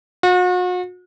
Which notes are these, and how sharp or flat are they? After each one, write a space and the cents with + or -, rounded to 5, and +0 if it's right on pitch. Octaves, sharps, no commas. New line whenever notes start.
F#4 -40